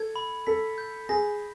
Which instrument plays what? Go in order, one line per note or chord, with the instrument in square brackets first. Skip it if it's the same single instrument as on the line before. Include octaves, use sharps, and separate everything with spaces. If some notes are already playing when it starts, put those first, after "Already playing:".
Already playing: [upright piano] A4 [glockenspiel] G#6
[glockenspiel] B5
[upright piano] A4 [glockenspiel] B6
[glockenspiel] G6
[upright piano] G#4 [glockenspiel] A#6